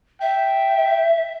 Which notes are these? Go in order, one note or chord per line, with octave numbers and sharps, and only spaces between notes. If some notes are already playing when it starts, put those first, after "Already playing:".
E5 G5